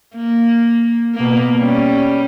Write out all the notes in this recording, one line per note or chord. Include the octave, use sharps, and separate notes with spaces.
A#3
B2 A#3
G3 C#4